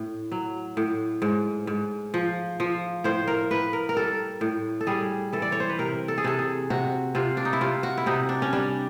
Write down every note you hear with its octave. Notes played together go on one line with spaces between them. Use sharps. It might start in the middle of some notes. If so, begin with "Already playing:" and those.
Already playing: A2
F#3
A2
G#2
G#2
F3
F3
A2 C5
A#4
A2 B4
A#4
A#4
G3 A4
A2
A4
G3 G#4
E3 A4
D5
C#5
C5
B4
C3 A#4
A4
G#4
C3 A4
G#4
C3 F#4
C3 F4
D4
D#4
E4
C3 F4
F#4
E4
C3 D#4
D4
C#4
G3 D4